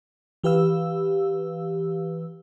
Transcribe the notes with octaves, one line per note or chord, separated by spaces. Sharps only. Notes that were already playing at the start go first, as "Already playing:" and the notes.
E3 G4 B4 F5 E6